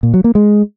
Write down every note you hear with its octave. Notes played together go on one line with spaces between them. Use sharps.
A#2
F#3
A#3
G#3